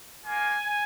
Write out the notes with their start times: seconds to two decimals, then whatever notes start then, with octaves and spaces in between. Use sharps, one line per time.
0.25 A#3 F4 G#5